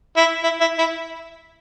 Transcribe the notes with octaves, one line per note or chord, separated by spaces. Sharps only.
E4
E4
E4
E4